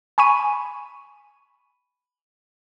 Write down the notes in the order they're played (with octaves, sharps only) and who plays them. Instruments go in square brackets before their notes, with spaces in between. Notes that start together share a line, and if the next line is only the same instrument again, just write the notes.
[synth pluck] G#5 B5 C#6 D#7